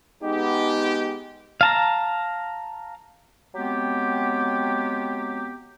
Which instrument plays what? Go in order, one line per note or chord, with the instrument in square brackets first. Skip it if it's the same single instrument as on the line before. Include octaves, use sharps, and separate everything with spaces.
[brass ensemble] G#3 B3 D#4 G4
[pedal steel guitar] F5 A5 A#5
[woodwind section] F#3 G#3 B3 C4 G4